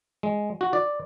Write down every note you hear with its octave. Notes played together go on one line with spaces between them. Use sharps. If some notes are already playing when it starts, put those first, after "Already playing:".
G#3
F#4
D5